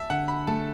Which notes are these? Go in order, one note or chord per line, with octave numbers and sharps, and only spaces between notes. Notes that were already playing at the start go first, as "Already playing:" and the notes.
Already playing: E5 A5
D3 F#5
B5
A3 A5